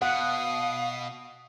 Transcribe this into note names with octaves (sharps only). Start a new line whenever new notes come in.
B2 F5 F#5 D#6